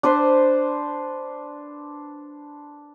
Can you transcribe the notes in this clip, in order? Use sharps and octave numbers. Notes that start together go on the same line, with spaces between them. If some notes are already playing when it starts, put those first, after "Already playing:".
D4 B4 C5